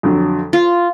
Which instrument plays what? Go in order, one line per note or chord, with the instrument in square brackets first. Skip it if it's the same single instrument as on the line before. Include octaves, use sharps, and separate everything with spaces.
[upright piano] F2 D3 F#3
[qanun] F4